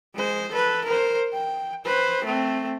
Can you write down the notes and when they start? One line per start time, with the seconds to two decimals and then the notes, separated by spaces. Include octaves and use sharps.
0.15 G#3 C5
0.52 A4 B4
0.85 A#4 C5
1.33 G5
1.85 B4 C5
2.25 A3 C4